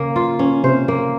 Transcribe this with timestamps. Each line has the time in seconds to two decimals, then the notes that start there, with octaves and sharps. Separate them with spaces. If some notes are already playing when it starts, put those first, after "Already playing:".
Already playing: C#3 A#3 C#4
0.16 F4
0.39 C#4
0.64 C3 C5
0.88 A#3